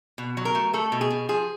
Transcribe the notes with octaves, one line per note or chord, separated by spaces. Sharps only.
B2
F#3
A#4
A3
A3 A4
B2
G#4
B2
F3 G#4